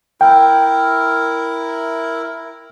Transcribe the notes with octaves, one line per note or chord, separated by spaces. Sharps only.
E4 A#4 G5